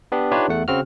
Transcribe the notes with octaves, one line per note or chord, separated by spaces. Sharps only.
B3 D4 G4
D4 D#4 F4 G4 B4 C#5
E2 A3 F#5
C#3 C4 F#4 F6